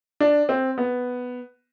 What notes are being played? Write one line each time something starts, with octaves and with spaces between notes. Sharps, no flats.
D4
C4
B3